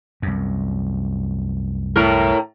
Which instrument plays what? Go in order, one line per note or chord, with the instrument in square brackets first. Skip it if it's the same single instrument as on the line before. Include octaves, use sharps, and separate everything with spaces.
[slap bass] C2 F#2
[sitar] A2 A#4